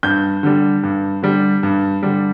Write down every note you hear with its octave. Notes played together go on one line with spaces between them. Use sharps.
G2 G6
D3 G3
G2
D3 G3
G2
D3 G3